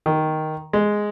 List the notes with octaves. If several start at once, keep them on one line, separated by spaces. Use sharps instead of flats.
D#3
G#3